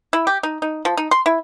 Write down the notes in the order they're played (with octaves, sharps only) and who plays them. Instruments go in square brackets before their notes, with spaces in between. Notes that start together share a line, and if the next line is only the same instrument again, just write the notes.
[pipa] E4
G4
D#4
D#4
F3
D#4
C6
E4